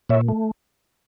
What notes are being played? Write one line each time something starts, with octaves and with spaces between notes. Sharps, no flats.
A#2 C#5 E5
A3